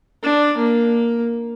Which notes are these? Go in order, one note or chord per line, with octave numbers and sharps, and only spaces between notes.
D4
A#3